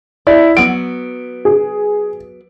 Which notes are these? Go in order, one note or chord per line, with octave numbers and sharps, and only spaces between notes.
E4 D5
F#3 B3 D7
G#4